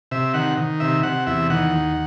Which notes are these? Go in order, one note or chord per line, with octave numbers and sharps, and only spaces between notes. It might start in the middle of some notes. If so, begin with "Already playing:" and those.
C3 E5
D#3 F#5
D#3
C3 E5
C3 F#5
E2 E5
D#3 F#5
D#2